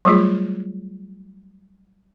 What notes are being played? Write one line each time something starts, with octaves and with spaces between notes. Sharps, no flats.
F#3 G3 A3 F4 G#4